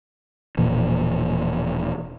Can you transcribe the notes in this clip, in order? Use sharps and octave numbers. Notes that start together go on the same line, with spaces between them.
E1 A#2 E3 F3